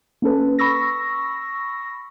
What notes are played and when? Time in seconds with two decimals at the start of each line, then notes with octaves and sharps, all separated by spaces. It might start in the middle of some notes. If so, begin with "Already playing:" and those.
0.22 A#3 C#4 A4 B4
0.59 B5 C#6 E6 A#6